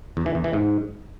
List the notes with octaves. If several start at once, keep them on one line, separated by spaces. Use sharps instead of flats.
E2
E3
E2
E3
G#2